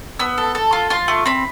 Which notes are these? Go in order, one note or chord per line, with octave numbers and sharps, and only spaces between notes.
B3 E6
A4
A4
F4
F4 C6
A3
C4 B5